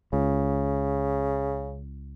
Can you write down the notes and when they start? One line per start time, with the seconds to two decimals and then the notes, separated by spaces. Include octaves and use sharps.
0.13 C#2 C#3